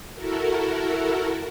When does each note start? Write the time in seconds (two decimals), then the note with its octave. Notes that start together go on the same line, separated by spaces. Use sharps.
0.14 E4 F#4 A4 A#4